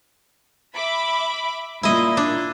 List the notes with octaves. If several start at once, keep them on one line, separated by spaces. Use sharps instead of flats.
E5 B5 D6
A#2 E4 D#5
D4